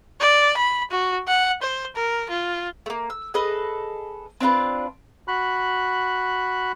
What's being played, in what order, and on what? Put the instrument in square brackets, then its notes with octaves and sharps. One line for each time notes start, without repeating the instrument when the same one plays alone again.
[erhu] D5
B5
F#4
F#5
C5
A#4
F4
[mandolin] A3 A#3
E6
G#4 A4 B4 D#5
C4 D4 F4 B4
[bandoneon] F#4 B5 F#6